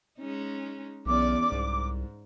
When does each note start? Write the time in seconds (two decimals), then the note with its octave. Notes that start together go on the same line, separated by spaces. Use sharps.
0.19 G#3 C#4 D#4
1.06 B1 E2 C#4 D5 D6
1.52 C2 G#2